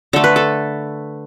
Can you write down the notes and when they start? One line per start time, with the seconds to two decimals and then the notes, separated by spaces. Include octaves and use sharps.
0.13 D3 A3 A4
0.24 B4
0.36 A4